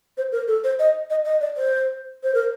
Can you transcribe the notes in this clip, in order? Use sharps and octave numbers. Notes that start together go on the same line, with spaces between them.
C5
A#4
A4
C5
D#5
D#5
D#5
D5
C5
C5
A#4